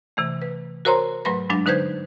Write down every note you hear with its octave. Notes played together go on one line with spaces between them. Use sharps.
C3 E3 A3
B4
F#4 A#4 C5 C#5 A#5 C6
G#2 F#3 A3 B4 B5 A#6
G2 F#3 G#3 D4 A6
D3 D#4 B4 C5 G6 G#6